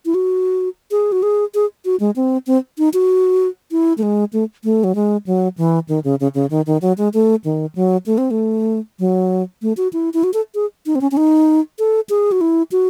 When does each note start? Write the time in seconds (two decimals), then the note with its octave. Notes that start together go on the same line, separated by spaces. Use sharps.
0.06 E4
0.14 F#4
0.91 G#4
1.12 F#4
1.23 G#4
1.54 G#4
1.85 F#4
2.00 G#3
2.16 C4
2.47 C4
2.78 D#4
2.94 F#4
3.71 E4
3.98 A3
4.03 G#3
4.33 A3
4.64 A3
4.84 F#3
4.95 G#3
5.26 F#3
5.58 E3
5.89 D#3
6.04 C#3
6.20 C#3
6.35 C#3
6.50 D#3
6.66 D#3
6.82 F#3
6.98 G#3
7.14 A3
7.44 D#3
7.75 F#3
8.06 A3
8.18 C4
8.31 A3
8.99 F#3
9.62 A3
9.77 F#4
9.93 E4
10.14 E4
10.24 F#4
10.34 A4
10.55 G#4
10.86 D#4
10.95 C4
11.01 C#4
11.11 C#4
11.17 D#4
11.79 A4
12.09 G#4
12.32 F#4
12.41 E4
12.72 F#4